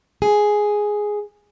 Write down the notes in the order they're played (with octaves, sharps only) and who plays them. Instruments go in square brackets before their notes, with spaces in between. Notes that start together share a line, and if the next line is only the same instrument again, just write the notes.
[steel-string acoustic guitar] G#4